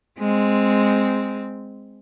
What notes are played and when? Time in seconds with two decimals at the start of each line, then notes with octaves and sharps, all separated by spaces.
0.19 G#3 C4